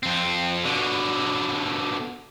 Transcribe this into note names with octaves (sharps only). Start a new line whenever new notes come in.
F2 C4
B2 D3